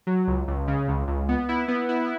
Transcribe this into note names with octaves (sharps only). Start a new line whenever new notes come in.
F#3
C#2
C#2
C#3
C#2
C#2
B3
E4
B3
E4